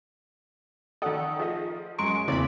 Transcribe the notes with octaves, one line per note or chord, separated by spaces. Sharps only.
D#3 A4 D5 F#5 D#6
F3 G#4 D#5
F#2 G#3 A#5 C6 C#6 D7
E2 C#3 E3 A#3 C4 D5 B5 D6